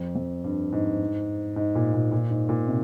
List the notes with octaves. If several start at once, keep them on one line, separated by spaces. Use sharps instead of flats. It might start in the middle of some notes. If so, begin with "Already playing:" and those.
Already playing: F2
F2
G2
G#2
G#2
A#2
A#2
A#2
G#2
A#2
C3